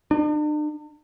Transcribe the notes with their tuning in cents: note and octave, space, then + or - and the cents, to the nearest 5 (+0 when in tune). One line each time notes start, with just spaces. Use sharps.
D4 +45